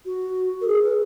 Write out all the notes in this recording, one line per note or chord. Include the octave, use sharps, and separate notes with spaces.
F#4
A#4
G#4
B4